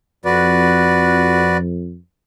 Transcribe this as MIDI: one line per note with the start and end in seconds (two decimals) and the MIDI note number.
0.25 1.96 41
0.25 1.57 66
0.25 1.57 71
0.25 1.57 74